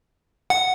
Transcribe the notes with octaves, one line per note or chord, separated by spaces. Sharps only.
F#5